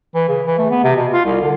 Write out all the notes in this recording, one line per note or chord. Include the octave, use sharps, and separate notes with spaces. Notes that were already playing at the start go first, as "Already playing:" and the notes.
E3
C#3
E3
A3
B3
C3
B2
F4
C2
D3